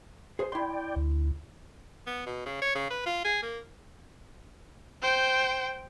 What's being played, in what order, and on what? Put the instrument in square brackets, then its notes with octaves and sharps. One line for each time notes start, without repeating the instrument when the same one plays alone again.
[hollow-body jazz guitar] G#4 C5
[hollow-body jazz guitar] E4 C6 [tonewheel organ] D5 G5
[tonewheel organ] D2
[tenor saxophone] B3
B2
C#3
C#5
C#3
B4
F4
G#4
A#3
[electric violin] C5 G5